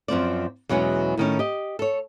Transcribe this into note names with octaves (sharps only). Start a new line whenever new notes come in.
F#2 F3 C4 D5
E2 B2 F#3 G#3 C#4
A2 D#3 C#4
G4 D#5
A4 C#5